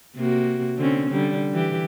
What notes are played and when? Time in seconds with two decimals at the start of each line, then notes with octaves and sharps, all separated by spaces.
0.16 C3 A#3 F#4
0.77 D3 C4 C#4
1.10 D3 G3
1.53 E3 G4